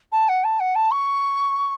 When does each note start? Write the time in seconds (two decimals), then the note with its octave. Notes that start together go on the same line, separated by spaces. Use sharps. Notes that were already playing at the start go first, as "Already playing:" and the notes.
0.12 A5
0.28 F#5
0.44 A5
0.60 F#5
0.75 A5
0.91 C#6